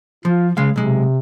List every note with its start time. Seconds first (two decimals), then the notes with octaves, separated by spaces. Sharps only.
0.25 F3 F4
0.57 C#3 G#3 F5
0.76 B1 C3 G#3